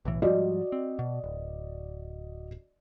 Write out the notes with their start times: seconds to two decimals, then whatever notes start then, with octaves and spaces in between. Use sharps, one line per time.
0.05 B1 A2 E3
0.22 G#2 F3 G3 F#4 D5 D#5
0.72 C4
0.99 B2
1.24 D1